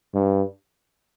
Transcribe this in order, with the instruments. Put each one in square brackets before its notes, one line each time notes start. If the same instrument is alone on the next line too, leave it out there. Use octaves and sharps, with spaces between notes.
[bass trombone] G2